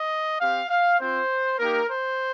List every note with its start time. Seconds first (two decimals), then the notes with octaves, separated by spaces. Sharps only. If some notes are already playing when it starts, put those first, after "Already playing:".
Already playing: D#5
0.40 C4 G4 F5
0.70 F5
0.99 C4 F4 C5
1.59 A#3 D#4 G4 A#4
1.89 C5